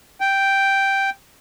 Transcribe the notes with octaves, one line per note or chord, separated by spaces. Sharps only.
G5